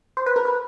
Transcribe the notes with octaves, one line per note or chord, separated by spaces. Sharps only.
C5
B4
A#4
B4